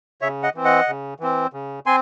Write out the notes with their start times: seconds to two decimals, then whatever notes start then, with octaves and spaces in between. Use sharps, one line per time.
0.21 C#3 C#5 E5
0.43 D#5 F#5
0.55 E3 C4
0.65 D#5 F#5
0.88 C#3
1.20 E3 C4
1.53 C#3
1.86 C4 G#5 C6